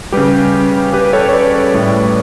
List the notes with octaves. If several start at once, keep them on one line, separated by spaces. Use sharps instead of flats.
C#3 G3 G4 B4
G4 B4
A4 C#5
C#5
B4 D5
A2 G3